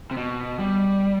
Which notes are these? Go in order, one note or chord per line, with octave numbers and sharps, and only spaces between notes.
C3
B2
G3